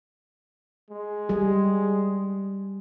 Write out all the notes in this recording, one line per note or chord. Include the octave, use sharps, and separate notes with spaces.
G#3
G3 G#4